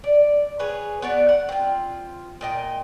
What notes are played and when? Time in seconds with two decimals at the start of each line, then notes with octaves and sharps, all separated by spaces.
0.04 D5
0.59 G#4 B4 C#5
1.02 B3 F#4 D5
1.29 F#5
1.49 C4 F4
2.41 A#2 D#5 G5